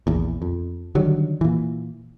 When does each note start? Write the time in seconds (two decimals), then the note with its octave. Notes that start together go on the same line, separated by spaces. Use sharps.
0.07 A#1 E2
0.42 F2
0.95 D3 D#3 F#3 G3
1.41 A#2 E3